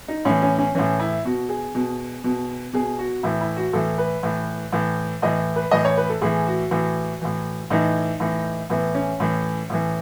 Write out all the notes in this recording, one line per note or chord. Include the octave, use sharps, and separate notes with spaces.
D#4
A2 E3 C#4
C#4
C#4
A2 E3 C#4
E4
B2 F#4
G#4
B2
B2
B2 G#4
F#4
A2 E3 E4
E4
F#4
A2 E3 A4
B4
A2 E3
A2 E3
A2 E3 D#5
B4
A2 E3 D#5
C#5
B4
A4
A2 E3 G#4
F#4
A2 E3
A2 E3
A2 E3 D#4
A2 E3
A2 E3 B3
C#4
A2 E3
A2 E3